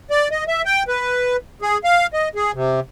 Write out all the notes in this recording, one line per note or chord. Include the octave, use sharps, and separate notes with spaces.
D5
D#5
E5
G5
B4
G#4
F5
D#5
G#4
C3